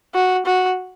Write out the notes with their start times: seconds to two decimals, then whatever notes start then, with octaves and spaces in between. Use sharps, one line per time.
0.14 F#4
0.46 F#4